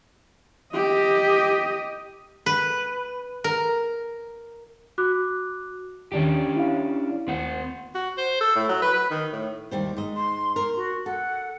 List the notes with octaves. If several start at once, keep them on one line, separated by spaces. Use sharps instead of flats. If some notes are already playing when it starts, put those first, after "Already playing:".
G4 D#5
B4
A#4
F#4 D6 F#6
D#2 D#3 C#4 D4 G4
E4 F5
D#2 C4 C5 F#5
F#4
C5
A4
A2
F#3
B4
B4
D#3
A2
D#2 G3 C5
G#2 D#5
C6
A#4 C6
F#4
A4 F#5